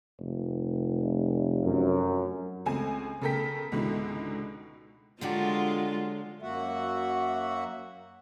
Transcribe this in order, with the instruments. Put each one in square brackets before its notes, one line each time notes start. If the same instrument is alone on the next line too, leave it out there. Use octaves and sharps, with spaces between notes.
[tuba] F1
[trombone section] F#2
[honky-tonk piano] C#2 A3 C4 G#5
C#3 A3 A4 A#4 G5 B6
C#2 G#2 B2 D3 E4
[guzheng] D3 F#3 G4 [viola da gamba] G#3 F4
[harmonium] F#2 A#3 F#4 E5 F#5